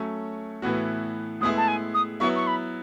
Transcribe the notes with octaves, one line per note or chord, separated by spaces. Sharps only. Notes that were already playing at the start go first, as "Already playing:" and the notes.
Already playing: F#3 A3 C#4
A2 E3 B3 F#4
A2 G#3 B3 E4 G#4 D#6
A5
G#5
D#6
F#3 B3 E4 C#6
C#6
B5